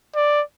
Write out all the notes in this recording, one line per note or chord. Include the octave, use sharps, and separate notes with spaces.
D5